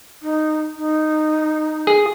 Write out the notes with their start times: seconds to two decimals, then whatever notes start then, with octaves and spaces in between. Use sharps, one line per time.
0.22 D#4
0.77 D#4
1.87 G#4